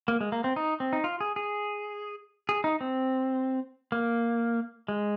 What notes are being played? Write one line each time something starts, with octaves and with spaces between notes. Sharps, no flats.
A#3
G#3
A#3
C4
D#4
C4
D#4
F4
G#4
G#4
G#4
D#4
C4
A#3
G#3